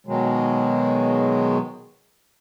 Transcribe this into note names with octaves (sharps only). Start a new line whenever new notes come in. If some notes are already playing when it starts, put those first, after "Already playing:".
B2 D#3 F#3 G#3